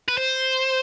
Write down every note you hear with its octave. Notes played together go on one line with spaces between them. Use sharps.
B4
C5